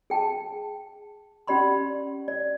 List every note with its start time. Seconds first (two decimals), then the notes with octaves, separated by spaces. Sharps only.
0.10 G#4 G5 A5
1.47 C#4 G4 D5 B5 C6
2.28 D5